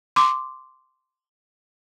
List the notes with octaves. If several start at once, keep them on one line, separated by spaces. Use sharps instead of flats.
C6 D6